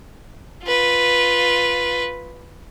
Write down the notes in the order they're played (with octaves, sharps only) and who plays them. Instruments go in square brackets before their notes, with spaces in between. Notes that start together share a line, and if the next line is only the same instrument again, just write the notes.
[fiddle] F4 B4